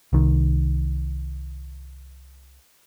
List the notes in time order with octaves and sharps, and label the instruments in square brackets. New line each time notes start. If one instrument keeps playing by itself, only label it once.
[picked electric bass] C2 D#3